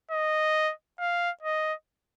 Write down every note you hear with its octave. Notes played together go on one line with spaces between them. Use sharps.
D#5
F5
D#5